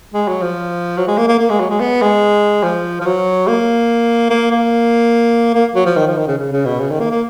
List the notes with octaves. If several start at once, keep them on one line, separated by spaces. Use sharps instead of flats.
G#3
F#3
F3
F#3
G#3
A#3
A#3
A#3
G#3
F#3
G#3
B3
G#3
F3
F3
F#3
A#3
A#3
A#3
A#3
F#3
F3
D#3
F3
D#3
C#3
C#3
C#3
B2
C#3
D#3
A#3
A#3